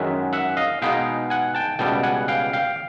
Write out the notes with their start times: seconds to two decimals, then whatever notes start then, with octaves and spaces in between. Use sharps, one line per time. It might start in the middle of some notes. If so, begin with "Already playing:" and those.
Already playing: F#2 D#3 G#3 E5 F#5
0.33 E5 F#5
0.57 D#5 F5
0.82 B2 G#3 B3 D#4 F5 G5
1.30 F#5 G#5
1.55 G5 A5
1.79 C#2 B2 G3 G5 A5
2.03 F#5 G#5
2.28 F5 G5
2.53 F5 G5